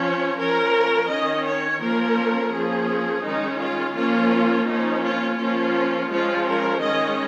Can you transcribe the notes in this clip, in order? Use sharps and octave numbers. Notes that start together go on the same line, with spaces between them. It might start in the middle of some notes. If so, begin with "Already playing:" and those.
Already playing: F3 C#4 C#5
F3 C#4 A#4
D#3 C#4 D#5
C#5
F3 A#3 C#4 A#4
F3 A#3 C#4 G#4
D#3 G#3 C#4 D#4
F4
F3 A#3 C#4 F4
F3 A#3 C#4 D#4
F4
F3 A#3 C#4 F4
F3 G#3 C#4 F4
A#4
D#3 G#3 C#4 D#5